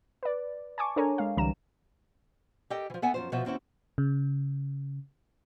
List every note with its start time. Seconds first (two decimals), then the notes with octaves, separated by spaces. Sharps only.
0.23 B4 D5
0.78 G#5 A5 C#6 D6
0.96 D4 A4 A#4 C#5 G#5 A#5
1.18 G#3 F5
1.37 C2 D3 E3 G3 A#5 E7
2.70 G4 A4 A#4 D#5 G5
2.90 E3 F3
3.02 B3 A4 E5 F#5 G#5
3.14 F#2 F3 C5
3.32 B2 F3 F#4 C5 E5
3.45 D#2 C4 C#4 E4 F#4
3.98 C#3